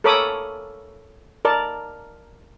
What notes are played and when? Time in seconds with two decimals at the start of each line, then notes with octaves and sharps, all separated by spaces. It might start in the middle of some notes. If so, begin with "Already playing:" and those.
0.04 A4 A#4 C#5 B5 D6 D#6
1.45 A#4 D5 A5